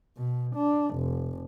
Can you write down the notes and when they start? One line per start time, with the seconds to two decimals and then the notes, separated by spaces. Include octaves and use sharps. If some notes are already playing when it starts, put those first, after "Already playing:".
0.17 B2
0.56 D4
0.95 F1